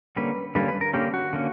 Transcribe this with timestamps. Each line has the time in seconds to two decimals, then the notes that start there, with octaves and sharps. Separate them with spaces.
0.16 D3 G3 A#3 C#4 B4
0.55 D3 G3 A#3 C#4 B4
0.68 B4
0.81 A#4
0.94 D3 A#3 C#4 G4
1.14 F#4
1.33 D3 A#3 C#4